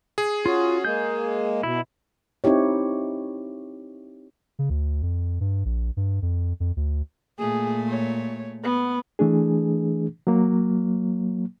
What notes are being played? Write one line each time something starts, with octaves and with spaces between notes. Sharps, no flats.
G#4
C#4 F4 F#4
G#3 A#3 G6
B2 E4
C4 D#4 E4 G4 C#5
C#3
D2
F2
G2
A#1
G2
F2
F2
D2
A#2 A3 G#4
C#5
B3
E3 A3 D4 G#4
F#3 A#3